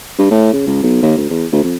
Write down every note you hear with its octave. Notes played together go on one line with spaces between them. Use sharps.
G2
A2
C#3
C#2
B1
D#2
D2
E2
D2
F2